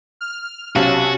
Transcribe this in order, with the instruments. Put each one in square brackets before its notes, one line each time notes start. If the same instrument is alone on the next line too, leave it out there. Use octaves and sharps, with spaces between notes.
[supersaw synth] F6
[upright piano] B1 F5 [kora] C3 [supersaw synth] C#4 A5 [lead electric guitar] F#4